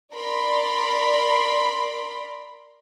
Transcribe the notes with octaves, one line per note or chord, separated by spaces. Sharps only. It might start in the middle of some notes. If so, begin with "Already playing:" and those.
A#4 D5 B5 C6